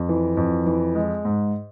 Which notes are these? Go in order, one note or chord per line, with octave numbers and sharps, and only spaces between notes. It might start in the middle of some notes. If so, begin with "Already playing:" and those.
Already playing: F2
E3
F2
E3
G#3
G#2